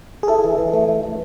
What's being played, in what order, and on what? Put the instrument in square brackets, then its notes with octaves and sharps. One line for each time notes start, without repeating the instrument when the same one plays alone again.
[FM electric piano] G#4
[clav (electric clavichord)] E4 [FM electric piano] A4
[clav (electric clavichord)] E3
E3
A3
E4
E3